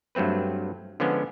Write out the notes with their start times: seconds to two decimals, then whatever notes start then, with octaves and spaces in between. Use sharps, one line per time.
0.15 G2 F#3 A3 C4 B4
1.00 D3 F3 G#3 B3 C#4 D4